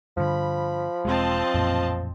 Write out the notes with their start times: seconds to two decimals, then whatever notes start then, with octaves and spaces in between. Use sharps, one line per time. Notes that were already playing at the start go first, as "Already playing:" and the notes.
0.17 G2 D3 F3 B5
1.05 E1 G#3 C4 D#5 A5
1.54 A1 F2 A#2